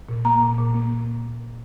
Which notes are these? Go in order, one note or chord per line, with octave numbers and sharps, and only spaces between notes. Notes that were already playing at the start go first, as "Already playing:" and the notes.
A#2
A#3 A#5
A#2
A#2
A#3